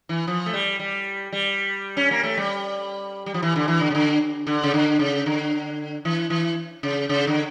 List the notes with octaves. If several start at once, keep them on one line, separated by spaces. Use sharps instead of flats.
E3
F3
A3
G3
G3
G3
C#4
A#3
A3
G3
G3
F3
E3
D3
E3
D3
C#3
D3
D3
C#3
D3
C#3
D3
E3
E3
C#3
C#3
D3